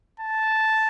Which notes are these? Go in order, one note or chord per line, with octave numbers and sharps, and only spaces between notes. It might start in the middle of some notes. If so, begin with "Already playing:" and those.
A5